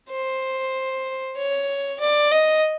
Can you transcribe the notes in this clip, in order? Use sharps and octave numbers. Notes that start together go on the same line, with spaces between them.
C5
C#5
D5
D#5